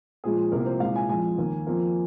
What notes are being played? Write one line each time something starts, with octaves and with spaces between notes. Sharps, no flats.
A#2 F3 G#3 G#4
C2 C3 F3 A#3 A#4
C5
C2 A#2 G#3 F5
G#5
F2 F3 G#3 G#5
D#2 D#3 A#3
F2 F3 A#3